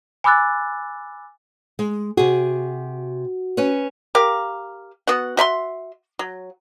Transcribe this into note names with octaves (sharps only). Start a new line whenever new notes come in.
G#5 B5 D6 E6 F#6 A6
G#3
C3 F#4 G#4
C#4 B4 C#5
G4 A#4 F5
B3 F#4 F#5
F#4 E5 B5 C6
F#3